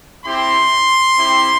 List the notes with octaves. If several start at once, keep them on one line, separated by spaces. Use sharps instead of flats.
C4 E4 G4 C6
C4 E4 G4